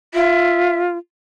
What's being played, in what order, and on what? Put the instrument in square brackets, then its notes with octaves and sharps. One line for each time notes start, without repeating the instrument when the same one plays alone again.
[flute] F4 [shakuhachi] E5